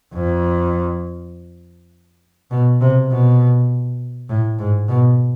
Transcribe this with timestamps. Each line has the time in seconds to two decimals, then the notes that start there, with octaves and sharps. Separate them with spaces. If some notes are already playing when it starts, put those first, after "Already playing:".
0.14 F2
2.51 B2
2.81 C3
3.11 B2
4.29 A2
4.58 G#2
4.89 B2